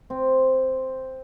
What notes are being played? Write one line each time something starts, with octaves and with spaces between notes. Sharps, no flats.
C4